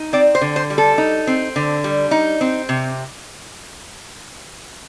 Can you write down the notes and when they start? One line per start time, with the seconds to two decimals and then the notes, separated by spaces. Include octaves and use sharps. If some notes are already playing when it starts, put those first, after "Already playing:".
Already playing: D#4
0.13 C4 D5
0.35 C5
0.41 D3
0.56 C5
0.70 G3
0.78 A4
0.98 D#4
1.27 C4
1.56 D3
1.84 G3
2.11 D#4
2.41 C4
2.69 C3